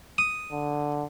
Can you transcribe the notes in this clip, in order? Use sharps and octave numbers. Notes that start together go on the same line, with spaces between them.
D#6
D3